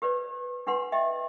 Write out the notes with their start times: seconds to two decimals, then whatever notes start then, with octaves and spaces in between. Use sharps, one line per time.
0.02 G4 B4 C5 D5
0.67 D4 G4 B4 F#5 C6
0.92 G4 D#5 E5 G5